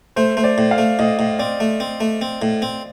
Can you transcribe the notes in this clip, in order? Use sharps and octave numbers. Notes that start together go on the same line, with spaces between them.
A3 C5
A3 C5
D5
A2
F5
A3
A2 D#5
A2
C4 D5
A3
C4
A3
C4
A2
C4